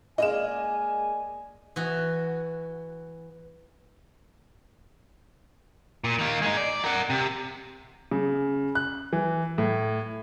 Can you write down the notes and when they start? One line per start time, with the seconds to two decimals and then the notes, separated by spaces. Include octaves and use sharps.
0.18 G#3 A#3 D5 D#5 G#5 E7
1.76 E3 F#4
6.04 A#2
6.19 D#3 A#3
6.42 G#3 D#4
6.57 D5
6.85 A#4 F#5
7.10 C3
8.11 C#3
8.75 F#6
9.13 E3
9.58 A2